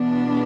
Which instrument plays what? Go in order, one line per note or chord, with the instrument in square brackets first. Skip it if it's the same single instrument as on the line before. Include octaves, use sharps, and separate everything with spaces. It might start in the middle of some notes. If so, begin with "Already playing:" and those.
Already playing: [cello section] E2 B2 B3 D4